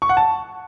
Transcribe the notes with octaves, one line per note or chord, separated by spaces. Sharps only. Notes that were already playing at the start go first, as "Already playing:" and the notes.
C#6
F#5
A5